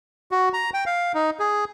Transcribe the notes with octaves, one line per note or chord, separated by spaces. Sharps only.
F#4
A#5
G5
F5
D#4
G#4